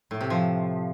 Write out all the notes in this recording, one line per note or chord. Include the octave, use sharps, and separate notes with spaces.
A2
C3
F3